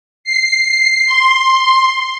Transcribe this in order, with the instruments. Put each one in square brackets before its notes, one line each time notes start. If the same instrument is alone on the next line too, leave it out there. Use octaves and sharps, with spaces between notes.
[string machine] C7
C6